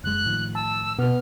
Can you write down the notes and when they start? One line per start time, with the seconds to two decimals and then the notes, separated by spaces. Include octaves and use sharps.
0.04 F#1 G#3 F#6
0.26 A2 D#3 F3
0.55 A5 E6
0.99 B2 B3 F6